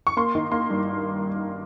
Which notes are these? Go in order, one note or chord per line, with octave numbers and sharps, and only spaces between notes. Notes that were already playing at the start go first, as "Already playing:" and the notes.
C#6
A#3 C6
D#3
A#3 C6
G2